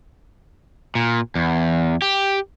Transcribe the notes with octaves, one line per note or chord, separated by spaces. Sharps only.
A#2
E2
G4